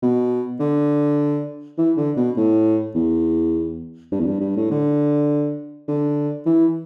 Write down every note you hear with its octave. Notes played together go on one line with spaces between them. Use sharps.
B2
D3
E3
D3
B2
A2
E2
G2
E2
G2
G2
A2
D3
D3
E3